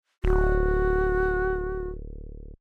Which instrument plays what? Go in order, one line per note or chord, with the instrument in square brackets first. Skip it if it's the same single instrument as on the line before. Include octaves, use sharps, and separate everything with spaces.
[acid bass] D1 [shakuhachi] F#4